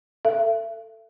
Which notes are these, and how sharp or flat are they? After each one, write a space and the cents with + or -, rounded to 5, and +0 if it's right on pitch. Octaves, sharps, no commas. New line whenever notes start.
A4 +20 E5 +35